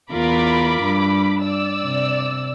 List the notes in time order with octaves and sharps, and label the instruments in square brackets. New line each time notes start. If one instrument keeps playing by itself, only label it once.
[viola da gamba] E2 F4 A#4 [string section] B5 D6
[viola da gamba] G2
[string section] D5 E6
[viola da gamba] C3